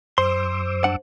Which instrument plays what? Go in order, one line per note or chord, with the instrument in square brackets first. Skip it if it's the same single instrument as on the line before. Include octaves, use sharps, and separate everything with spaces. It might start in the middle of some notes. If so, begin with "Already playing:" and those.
[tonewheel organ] F#2 D6 E6 [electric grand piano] C5 [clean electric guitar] C6
[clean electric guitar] G2 D4 F#5